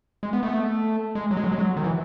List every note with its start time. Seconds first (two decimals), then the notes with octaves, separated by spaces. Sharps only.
0.23 G#3
0.33 B3
0.43 A3
0.48 B3
0.53 A3
1.15 G#3
1.31 F#3
1.37 G#3
1.44 F#3
1.52 G#3
1.59 F#3
1.77 D#3
1.84 E3